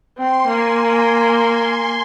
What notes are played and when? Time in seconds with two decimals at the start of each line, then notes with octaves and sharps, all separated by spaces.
0.18 C4 C6
0.47 A#3 G#5
0.77 G#5